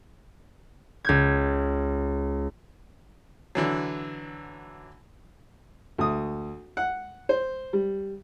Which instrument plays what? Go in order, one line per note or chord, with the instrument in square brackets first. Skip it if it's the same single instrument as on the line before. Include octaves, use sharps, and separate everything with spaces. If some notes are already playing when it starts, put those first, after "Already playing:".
[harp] C#2 G6 G#6
[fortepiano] D3 E3 F#3
D2 D#6
F#5
C5
G3